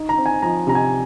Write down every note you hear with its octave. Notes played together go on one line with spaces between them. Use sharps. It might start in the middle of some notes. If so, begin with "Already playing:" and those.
Already playing: D#4
A#5
C4
G#5
F3 A#5
C3 A#5
G#5